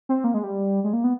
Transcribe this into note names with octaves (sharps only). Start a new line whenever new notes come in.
C4
A#3
G#3
G3
G#3
A#3
B3